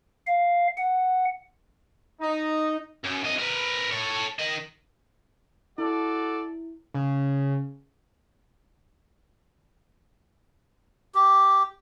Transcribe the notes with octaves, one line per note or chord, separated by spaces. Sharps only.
F5
F#5
D#4
F#2
C2 D#5
A#4 B4
A4 C#5
D#3 D#5
E4 F#4 A4 D5
C#3
G4